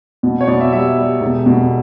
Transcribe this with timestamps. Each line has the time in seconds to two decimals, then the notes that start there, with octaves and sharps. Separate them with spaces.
0.23 B2
0.41 C#5
0.47 B2 D5
0.61 E5
0.72 G3 E5
0.96 G3
1.21 E1
1.46 B2